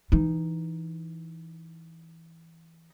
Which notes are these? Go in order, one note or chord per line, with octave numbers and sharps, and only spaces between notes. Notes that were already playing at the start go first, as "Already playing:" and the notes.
E3 D#4